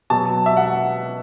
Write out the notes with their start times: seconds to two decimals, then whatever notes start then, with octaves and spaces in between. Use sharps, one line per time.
0.10 B2 F#3 A5
0.46 E5
0.57 F#5